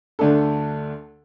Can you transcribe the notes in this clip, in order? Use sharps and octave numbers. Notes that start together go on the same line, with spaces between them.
D2 D3 A3 D4 A4